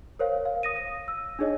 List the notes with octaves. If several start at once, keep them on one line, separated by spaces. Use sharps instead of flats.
A#4 C5 C#5 F5
F5
D#6 A#6 D#7
A#6
E6
D4 D#4 G#4 C#5 D#5